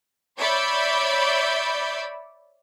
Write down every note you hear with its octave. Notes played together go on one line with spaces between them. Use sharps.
C#5 D5 E5 B5 G6